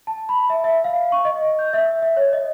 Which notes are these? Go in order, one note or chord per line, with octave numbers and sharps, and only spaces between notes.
A5
B5
E5
E5
F5
C#6
D#5
G6
E5
E5
C#5
D#5